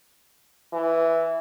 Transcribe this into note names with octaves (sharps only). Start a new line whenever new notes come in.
E3